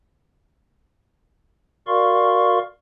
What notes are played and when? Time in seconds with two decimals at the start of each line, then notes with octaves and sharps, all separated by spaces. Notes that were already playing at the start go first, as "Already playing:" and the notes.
1.87 F#4 A#4 D5 F5 C6 C#6